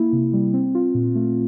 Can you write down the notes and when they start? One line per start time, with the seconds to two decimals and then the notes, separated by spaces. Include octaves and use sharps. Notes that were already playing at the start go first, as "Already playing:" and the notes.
Already playing: A#3 E4
0.13 C3
0.33 G3
0.53 C4
0.75 F4
0.95 A#2
1.15 A3